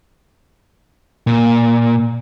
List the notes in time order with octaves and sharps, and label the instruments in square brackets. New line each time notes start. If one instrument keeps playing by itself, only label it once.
[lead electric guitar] A#2